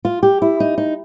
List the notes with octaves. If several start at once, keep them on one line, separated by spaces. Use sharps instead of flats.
F4
G4
E4
D#4
D#4